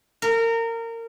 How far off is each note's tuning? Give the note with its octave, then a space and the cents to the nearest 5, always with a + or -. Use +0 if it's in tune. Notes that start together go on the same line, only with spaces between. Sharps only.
A#4 -25